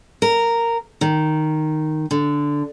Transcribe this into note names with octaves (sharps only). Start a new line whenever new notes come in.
A#4
D#3
D3